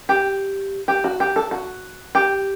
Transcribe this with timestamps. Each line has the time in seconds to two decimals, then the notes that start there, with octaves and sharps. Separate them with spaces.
0.09 G4
0.88 G4
1.04 F#4
1.20 G4
1.36 A4
1.51 F#4
2.15 G4